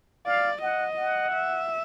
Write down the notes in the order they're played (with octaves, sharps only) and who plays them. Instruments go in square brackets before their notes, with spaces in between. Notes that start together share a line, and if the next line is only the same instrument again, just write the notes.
[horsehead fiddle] D5 [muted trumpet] F5
[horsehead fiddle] D#5 [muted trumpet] F#5
[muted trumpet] F#5
[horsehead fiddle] E5